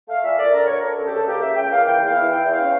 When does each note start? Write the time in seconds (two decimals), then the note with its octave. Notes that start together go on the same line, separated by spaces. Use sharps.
0.08 A3 F5
0.23 A#2 E5
0.37 A#2 D5
0.52 D3 A#4
0.65 D2 C#5
0.78 D4 A#4
0.97 C#3 A4
1.06 G4
1.12 C#2 A4
1.26 A#3 G4
1.41 C#3 E5
1.55 C#2 G5
1.70 A#3 F5
1.86 E3 G5
1.99 E2
2.07 F5
2.15 E4
2.29 E3 G5
2.44 E2
2.51 F5
2.59 C#4